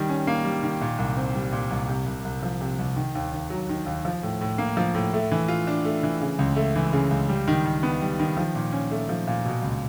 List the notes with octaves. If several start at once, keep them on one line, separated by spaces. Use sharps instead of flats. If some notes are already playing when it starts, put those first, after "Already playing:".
Already playing: D#3 G3
C#4
A#3
G3
D#3
A#2
C2
C4
G3
A#2
C2
C3
C2
C2
F3
C3
C2
D#3
D#2
D#2
F#3
D#3
D#2
F3
A2
A2
A#3
F3
A2
A3
E3
F4
D4
A3
E3
C#3
C#2
A3
E3
C#3
C#2
G3
D#3
D#3
B3
G3
D#3
F3
A#2
C#4
A3
F3
A#2
B2
C#2